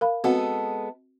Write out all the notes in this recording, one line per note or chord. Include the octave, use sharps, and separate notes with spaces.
A#4 F5 B5
G#3 B3 C4 F#4 A4 F#5